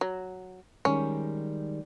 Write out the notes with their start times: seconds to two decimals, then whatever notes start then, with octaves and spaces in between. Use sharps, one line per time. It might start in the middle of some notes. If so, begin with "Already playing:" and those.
0.01 F#3
0.85 D#3 G3 G#3 C#4